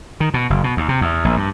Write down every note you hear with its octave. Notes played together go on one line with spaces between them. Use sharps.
D#3
B2
F#1
B2
D#2
C3
E2
A#1
G2